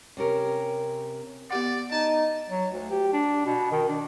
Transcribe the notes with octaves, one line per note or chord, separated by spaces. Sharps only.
C3 C#4 A#4
B3 G4 D5 F#5
D#4 A5
F#3
D2
G4
D4
B2
D#3
D4